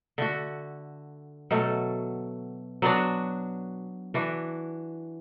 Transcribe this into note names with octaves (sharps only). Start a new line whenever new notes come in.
D3 A3 F#4
B2 F#3 A3
F#3 B3 D4 F#4
E3 D4 F#4